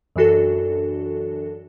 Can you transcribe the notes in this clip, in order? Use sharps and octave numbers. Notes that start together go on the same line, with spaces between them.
F#2 E3 D4 F#4 A4